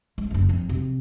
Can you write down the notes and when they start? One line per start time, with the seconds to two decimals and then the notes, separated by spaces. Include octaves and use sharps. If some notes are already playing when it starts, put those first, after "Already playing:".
0.18 G#3
0.31 F#1 D2
0.49 F2
0.69 C3